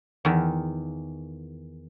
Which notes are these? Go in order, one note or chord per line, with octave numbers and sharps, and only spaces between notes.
E2 D#3